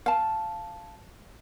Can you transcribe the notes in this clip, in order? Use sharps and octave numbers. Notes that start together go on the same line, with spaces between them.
F5 A5